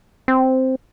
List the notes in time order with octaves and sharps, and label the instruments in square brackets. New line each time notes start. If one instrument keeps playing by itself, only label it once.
[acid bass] C4